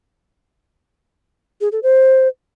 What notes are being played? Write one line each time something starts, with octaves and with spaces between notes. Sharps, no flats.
G#4
A4
C5